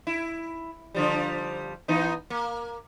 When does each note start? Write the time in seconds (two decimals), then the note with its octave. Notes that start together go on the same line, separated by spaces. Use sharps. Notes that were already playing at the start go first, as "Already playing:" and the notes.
0.07 E4
0.95 D3 F3 G3
1.88 E3 B3 D#4
2.30 A#3